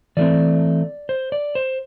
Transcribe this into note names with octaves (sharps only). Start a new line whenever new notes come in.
E3 A3 C4 D5
C5
D5
C5